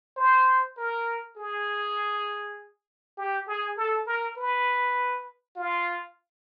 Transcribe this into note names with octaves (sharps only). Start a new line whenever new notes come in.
C5
A#4
G#4
G4
G#4
A4
A#4
B4
F4